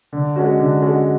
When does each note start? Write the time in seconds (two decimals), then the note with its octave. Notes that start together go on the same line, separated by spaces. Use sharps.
0.13 D3
0.36 G#3 C#4 F#4
0.59 D3
0.82 G#3 C#4 F#4